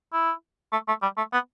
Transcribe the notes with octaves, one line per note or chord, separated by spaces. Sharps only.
E4
A3
A3
G3
A3
B3